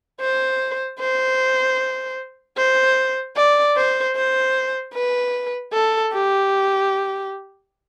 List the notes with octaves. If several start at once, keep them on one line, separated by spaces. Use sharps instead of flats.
C5
C5
C5
D5
C5
C5
B4
A4
G4